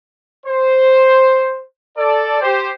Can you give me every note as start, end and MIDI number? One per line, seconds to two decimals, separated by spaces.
0.46 1.63 72
1.98 2.39 69
1.98 2.39 74
2.41 2.70 67
2.41 2.70 72